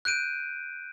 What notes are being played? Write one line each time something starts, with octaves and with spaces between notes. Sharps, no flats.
F#6 G6 D7 D#7